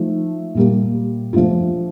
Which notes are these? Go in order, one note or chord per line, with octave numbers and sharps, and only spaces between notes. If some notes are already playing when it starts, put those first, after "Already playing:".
Already playing: F3 A3 D#4
A#2 G3 A#3
F3 A3 D4 F4